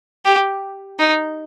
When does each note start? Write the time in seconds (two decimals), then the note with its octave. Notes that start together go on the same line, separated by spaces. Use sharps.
0.25 G4
0.99 D#4